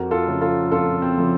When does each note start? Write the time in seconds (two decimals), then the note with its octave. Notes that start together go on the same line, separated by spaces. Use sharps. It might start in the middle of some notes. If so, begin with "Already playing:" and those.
Already playing: F2 F#4 A#4
0.11 F4 A4
0.27 C#3 F3 A3
0.41 F4 A4
0.71 F2 F4 A4
1.02 C4
1.17 C#3 F3 A3